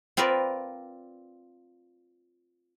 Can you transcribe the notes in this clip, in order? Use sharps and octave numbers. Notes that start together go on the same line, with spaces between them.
C4 F4 A#4 B4 D5